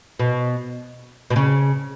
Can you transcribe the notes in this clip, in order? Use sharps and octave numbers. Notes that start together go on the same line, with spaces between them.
B2
B2
C#3